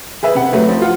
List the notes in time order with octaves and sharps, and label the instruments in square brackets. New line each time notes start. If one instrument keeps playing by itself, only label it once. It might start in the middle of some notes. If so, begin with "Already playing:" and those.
[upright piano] G#4 B4 E5
C3 G4 F#5
C3 F#3 A3 F#4 B4
F3
F4 F#5